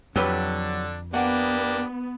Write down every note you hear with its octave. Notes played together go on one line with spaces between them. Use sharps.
F2 D3 F#3 D4 G4 B4
A#3 B3 D4 G4 F#5